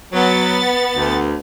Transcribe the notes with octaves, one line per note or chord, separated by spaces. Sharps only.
F#3 B3 A6
D2